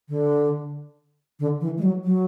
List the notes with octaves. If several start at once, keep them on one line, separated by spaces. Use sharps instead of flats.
D3
D3
E3
G#3
F#3
F#3